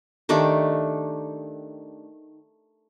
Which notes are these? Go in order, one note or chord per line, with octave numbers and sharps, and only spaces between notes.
D#3 A3 D4 G4